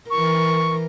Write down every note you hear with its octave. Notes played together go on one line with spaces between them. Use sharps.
E3 A#4 C#6